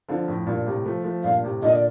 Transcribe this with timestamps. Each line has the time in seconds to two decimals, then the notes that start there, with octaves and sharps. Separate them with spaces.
0.09 D3 F3
0.28 F2 A2
0.47 G2 A#2
0.66 A2 C3
0.85 F3 A3
1.04 F3 A3
1.23 G2 A#2 F5
1.43 A2 C3
1.62 A#2 D3 D#5
1.73 D5